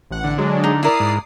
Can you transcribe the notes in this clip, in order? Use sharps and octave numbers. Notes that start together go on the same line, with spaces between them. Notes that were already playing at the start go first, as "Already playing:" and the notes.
A1 F#5
D3
F#3 G#3 D4
D#4
E4 A#4 D5 D#6 C7
G#2